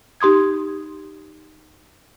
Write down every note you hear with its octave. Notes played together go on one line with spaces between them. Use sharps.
D#4 G4 C6 D#6 G#6